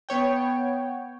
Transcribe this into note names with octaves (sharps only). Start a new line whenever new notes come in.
B3 C#5 G5